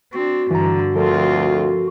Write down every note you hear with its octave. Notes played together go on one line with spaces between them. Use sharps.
C4 D4 F#4
G2 D3 E3 A#5
D2 F3 C4 F4 A4 A#4